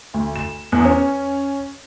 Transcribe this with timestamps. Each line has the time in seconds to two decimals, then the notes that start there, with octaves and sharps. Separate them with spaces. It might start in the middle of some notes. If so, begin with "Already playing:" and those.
0.14 D2
0.36 E7
0.72 E2
0.85 C#4